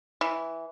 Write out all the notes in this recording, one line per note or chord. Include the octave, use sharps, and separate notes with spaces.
E3